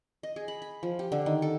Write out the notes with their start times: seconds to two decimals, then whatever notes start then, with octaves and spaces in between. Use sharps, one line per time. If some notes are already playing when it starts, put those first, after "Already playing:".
0.23 D#5
0.36 G#4
0.48 B5
0.62 B5
0.83 F3
0.99 G4
1.12 D3
1.26 D#3
1.42 A4